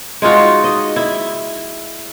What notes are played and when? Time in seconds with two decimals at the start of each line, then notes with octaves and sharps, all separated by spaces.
0.22 G#3 D#4 F4 F#4
0.64 D#5
0.96 E4